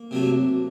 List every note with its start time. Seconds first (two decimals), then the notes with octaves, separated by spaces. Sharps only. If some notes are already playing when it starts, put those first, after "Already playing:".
Already playing: A#3
0.11 C3 F#3 A3